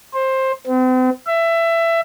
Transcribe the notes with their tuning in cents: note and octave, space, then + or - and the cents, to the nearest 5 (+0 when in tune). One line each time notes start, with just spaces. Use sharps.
C5 +15
C4 -40
E5 +20